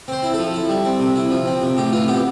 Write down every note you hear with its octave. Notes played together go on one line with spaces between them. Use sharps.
C4 C5
E4
F3 A4
E4
G3
C4
C3
E4
F3
C4
C3
A2 G4
E3 F4
B3 G4